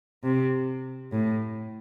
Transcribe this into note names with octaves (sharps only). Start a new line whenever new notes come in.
C3
A2